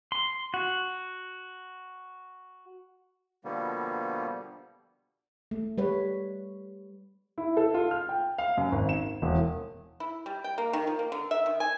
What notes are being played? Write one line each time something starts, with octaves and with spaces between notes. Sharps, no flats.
C6
F#4
B2 D3 F3 G3 A#3 B3
A3
G3 B4 C#5
E4
A4
F4
F6
G5
F5
F#2
G#1
E7
E1
E4
G3
G5
A#3
D#3
F3
A#3
D3
E5
D#3
G#5